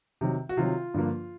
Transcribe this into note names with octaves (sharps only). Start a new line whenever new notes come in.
C3 D#3 F#3
F#4
C3 D#3 F#3 F4
G2 D3 F3 A#3